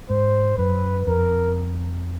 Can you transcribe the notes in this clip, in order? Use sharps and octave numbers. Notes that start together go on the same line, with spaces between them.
G#2 C5
F#2 B4
F2 A#4